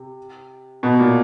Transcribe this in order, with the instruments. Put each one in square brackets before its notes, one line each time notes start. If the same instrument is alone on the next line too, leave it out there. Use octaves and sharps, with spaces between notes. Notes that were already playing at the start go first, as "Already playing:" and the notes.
Already playing: [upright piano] C3
B2
A#2